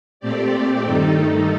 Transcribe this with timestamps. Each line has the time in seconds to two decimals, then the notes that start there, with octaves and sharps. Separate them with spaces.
0.20 A#2 A3 C4 G4 D5
0.85 G2 D#3 A3 D#4 A4